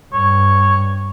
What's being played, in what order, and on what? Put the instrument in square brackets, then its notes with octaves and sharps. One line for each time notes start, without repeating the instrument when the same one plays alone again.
[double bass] G2 [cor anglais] C#5